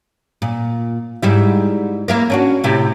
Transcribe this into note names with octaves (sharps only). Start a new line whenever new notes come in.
A#2
G#2 G3 E4
A#3 E4 A#4
C#4 D4 F#4
A2 C3 E4